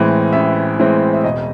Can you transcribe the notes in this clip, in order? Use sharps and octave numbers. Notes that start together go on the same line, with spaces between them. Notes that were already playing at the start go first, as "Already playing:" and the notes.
Already playing: A1 A2 E3 G#3 C4
A1 E5
A2 E3 G#3 C4
E5
E1 D#5